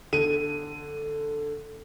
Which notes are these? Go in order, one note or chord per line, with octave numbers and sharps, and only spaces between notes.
D3 D#7